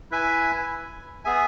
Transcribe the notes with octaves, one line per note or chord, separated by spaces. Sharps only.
E4 B4 E5 G#5
B3 G#4 E5 G#5